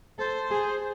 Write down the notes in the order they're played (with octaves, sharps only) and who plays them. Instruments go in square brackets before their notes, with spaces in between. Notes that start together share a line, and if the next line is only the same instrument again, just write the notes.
[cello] A4 [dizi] C5
[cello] G#4